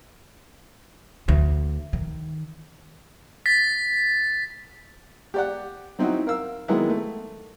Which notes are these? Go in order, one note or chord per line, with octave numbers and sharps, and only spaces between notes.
D2
D#3
A6 B6
G4 D5 F#5
F#3 C4 D#4 E4 F#4
A#4 F5 E6
D#3 F#3 G#3 A#3 B3 E4
A3